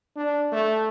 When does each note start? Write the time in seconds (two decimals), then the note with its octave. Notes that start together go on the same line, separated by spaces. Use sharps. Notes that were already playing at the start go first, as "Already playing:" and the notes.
0.16 D4
0.52 A3